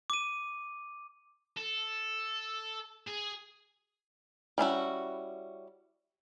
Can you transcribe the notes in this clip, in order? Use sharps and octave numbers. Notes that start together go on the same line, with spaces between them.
D6 D#7
A4
G#4
G3 C#4 E4 F#4